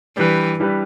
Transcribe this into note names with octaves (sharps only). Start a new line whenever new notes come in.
E3 G3 D4 G4 B4
E3 G3 D4 G4 B4